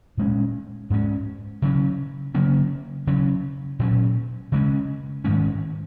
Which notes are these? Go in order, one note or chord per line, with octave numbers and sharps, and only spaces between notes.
A#2 G#3 C#4
G#2 G#3 C#4
C#3 F#3 C#4
C#3 F#3 A#3 C#4
C#3 F#3 C#4
A#2 F#3 C#4
C#3 G#3 C#4
G#2 D#3 G#3 C#4